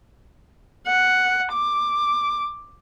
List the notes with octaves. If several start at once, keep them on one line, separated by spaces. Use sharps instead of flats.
F#5
D6